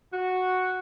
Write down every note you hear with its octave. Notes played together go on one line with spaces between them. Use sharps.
F#4